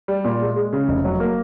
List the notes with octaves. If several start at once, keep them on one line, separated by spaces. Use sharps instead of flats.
G3
A#2
G#3
G#3
C#3
F1
F#3
A#3